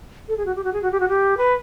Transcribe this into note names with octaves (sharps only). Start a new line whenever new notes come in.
A4
G#4
F#4
G4
F#4
G#4
F#4
G4
F#4
G4
B4